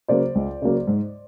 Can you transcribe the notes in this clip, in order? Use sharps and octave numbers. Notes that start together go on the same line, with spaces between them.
C#3 F#3 A#3 C5 D5
C#2
C#3 F#3 A#3
G#2